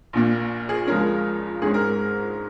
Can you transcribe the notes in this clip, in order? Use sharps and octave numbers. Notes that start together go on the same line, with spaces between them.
A#1 A#2 A#3
G#4
C#2 C#3 F3 G#3 C#4 A#4
G#2 G#3 C#4 G#4
A#4